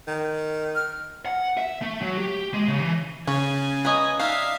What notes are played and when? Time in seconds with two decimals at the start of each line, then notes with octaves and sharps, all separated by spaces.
0.08 D#3
0.75 F6
1.26 F#5
1.57 E5
1.82 A3
2.02 F#3
2.18 G4
2.54 G#3
2.68 C#3
2.81 E3
3.27 C#3 C#5 G#5
3.85 B3 C#4 D#5 A#5
4.20 D4 D#4 E5 F5